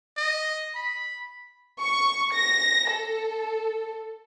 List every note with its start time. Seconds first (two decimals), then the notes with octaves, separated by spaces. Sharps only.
0.17 D#5
0.75 B5
1.80 C#6
2.33 A#6
2.90 A4